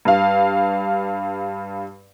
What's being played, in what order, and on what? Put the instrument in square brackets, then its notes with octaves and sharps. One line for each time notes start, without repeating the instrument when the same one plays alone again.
[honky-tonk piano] G2 F5